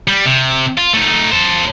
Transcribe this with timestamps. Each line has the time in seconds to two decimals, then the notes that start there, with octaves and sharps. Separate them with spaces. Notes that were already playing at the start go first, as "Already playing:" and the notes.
0.08 G3
0.26 C3
0.78 F4
0.93 A3 D#4
1.32 A4 C5